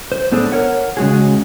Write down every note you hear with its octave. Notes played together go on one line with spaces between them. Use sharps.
C5
A2 B3 D4 G#4 A4
A#4 C#5 F#5
C#3 G#3 F#4 G#4